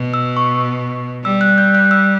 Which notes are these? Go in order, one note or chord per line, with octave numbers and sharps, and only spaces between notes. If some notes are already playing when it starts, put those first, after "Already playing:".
Already playing: B2
E6
C#6
G3 E6
F#6
G6
F#6
E6